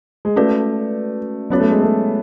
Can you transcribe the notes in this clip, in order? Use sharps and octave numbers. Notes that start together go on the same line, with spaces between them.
G#3
A3 C#4 F#4 B4 D5
F#3 B3 C#4 F#4 C#5
A3
G#3
A3